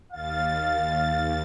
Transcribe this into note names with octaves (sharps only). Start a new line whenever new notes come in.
D#2 F5 A6